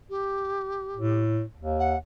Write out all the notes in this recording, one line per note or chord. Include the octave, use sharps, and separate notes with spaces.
G4
A2
D#2
F#5